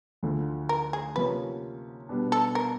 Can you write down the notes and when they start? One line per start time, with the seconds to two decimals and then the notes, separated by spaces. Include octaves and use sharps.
0.23 D2 D3 F3
0.69 A#4
0.93 G#4
1.16 C3 F3 A#3 C#4 B4
2.09 B2 G3 B3 D4
2.32 A4
2.55 A#4